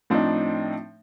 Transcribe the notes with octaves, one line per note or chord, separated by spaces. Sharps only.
A2 F3 C4 D4 D#4